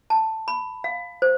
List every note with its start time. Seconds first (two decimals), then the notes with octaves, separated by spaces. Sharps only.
0.10 A5
0.48 B5
0.84 F5
1.22 C5